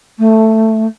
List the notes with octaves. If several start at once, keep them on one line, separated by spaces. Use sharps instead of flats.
A3